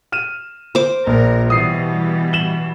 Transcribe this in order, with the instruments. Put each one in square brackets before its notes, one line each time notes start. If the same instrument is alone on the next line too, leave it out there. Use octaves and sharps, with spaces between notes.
[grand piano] F6 D#7 E7
[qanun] C5 D6
[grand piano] A#1 A#2 [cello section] A#4
[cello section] B2 E3 G3 [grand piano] D#6 C7 D#7
[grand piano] E7 F#7 G7